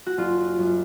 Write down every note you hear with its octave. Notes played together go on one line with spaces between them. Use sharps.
F#4
F#1 F4
F#2